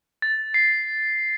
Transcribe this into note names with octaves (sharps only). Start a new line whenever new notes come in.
A6
C7